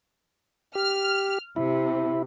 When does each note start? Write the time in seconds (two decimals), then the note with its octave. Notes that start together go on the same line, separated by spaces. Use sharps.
0.75 G4 F6
1.56 C3 E4